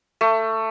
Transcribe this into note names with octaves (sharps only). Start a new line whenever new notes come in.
A3